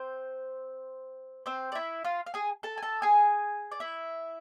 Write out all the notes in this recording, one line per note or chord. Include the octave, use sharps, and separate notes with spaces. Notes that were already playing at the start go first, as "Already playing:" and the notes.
Already playing: C4 C5
C4 C5
D5
E4 E5
F4 F5
F5
G#4 G#5
A4 A5
G#5
A4 A5
G#4 G#5
D5
E4 E5